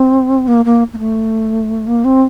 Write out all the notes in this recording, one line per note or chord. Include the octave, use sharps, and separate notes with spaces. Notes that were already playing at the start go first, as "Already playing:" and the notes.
Already playing: C4
A#3
A#3
A#3
A3
A#3
C4